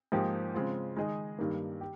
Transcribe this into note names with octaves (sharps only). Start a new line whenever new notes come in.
G#2 F3 A#3 D#4 G4
C#3 G#3 C4 F4
D#3 G#3 D#4 G#4 D#5
G2 D#3 G3 A#3
G4